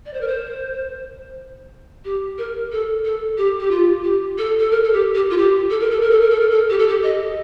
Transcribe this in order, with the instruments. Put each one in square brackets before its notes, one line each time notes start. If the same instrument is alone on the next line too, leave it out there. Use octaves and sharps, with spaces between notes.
[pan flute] D5
C5
A#4
C5
G4
A#4
A4
A4
G4
G4
F4
G4
A4
A4
A#4
A4
G4
G4
F4
G4
A4
A#4
A4
A#4
A4
A#4
A4
A#4
A4
G4
A4
G4
D#5